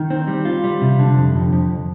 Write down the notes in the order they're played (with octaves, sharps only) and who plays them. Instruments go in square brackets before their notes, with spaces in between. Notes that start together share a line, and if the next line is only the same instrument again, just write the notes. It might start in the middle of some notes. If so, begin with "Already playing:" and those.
Already playing: [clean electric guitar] D#3
C4
G3
F4
G3
C3
D3
F2
F2
F2